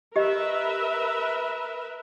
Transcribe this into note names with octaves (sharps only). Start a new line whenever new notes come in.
G4 A#4 B4 D#5 E5